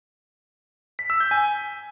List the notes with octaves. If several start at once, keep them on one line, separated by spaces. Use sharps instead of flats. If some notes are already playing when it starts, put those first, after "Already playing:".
B6
E6
G6
G#5